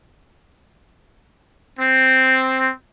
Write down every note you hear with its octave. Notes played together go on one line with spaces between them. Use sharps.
C4